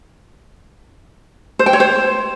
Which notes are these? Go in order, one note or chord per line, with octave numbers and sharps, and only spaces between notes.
C5
G5
C#5
C5